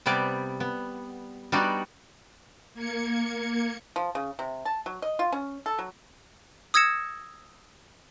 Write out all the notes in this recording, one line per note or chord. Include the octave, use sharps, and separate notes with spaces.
C3 G3 B3 D5
B3
G3 B3 D4 D#4 F#4
A#3 G#6 C#7
F3
C#3
C3
A5
F#3
D#5
F4
C#4
A4
F#3
D#6 E6 G#6 A#6 C#7 E7